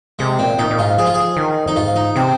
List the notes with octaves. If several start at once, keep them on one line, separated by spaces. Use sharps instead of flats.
C3 G#3
A#2 C4
A#2 D#4
A#2
G#2 F4
F3 G#4
F4
G#4
D#3
F2 D#4
G#2 F4
D#4
C3 C4